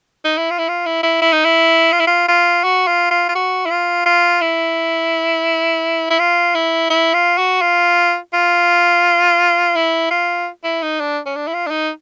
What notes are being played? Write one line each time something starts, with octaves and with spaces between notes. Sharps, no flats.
D#4
E4
F4
E4
F4
E4
E4
E4
D#4
E4
F4
E4
F4
F4
F#4
F4
F4
F4
F#4
E4
F4
F4
E4
E4
F4
E4
E4
F4
F#4
F4
F4
E4
F4
E4
D#4
D4
C#4
D4
E4
F4
D4
D#4